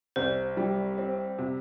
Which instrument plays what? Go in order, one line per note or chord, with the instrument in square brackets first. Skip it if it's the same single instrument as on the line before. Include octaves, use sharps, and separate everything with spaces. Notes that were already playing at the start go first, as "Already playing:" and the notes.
[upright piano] C2 [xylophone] C5
[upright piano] G3
C4
C3